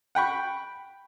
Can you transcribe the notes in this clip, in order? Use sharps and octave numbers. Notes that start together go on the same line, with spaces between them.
F#5 G5 B5 C#6